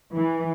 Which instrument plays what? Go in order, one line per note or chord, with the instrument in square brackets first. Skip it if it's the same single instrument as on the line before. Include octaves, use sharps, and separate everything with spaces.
[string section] E3